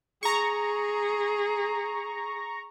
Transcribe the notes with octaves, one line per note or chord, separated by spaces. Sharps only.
G#4 A#5 C#6